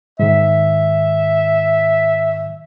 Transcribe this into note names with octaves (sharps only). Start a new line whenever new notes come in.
G#2 D#3 E5